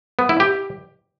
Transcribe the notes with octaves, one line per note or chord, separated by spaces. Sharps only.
B3
E4
G4